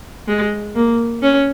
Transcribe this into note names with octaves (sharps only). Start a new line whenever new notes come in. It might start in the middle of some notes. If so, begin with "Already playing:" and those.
G#3
A#3
C#4